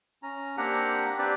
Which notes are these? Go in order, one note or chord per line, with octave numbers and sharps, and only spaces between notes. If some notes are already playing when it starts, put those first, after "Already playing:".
C#4 A#5
A#3 C4 D4 G4 F#5 A#5
C4 D4 G4 B4 D5